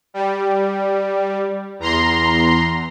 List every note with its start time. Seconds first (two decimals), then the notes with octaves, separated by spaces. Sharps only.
0.14 G3
1.79 E2 A#5 C6